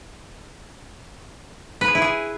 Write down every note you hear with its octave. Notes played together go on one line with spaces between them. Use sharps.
B4
G#4
E4
G#4